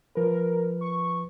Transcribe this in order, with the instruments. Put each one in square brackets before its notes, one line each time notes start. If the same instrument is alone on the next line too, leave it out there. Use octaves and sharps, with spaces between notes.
[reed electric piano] F3 B4 [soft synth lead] A#4
[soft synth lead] C#6